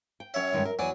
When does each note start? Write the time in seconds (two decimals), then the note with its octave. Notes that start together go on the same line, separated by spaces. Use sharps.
0.20 G5
0.34 F#2 C#5 E5
0.52 G2 D#3 G#3
0.65 A#4
0.79 E2 F#3 C#5 D5 G#5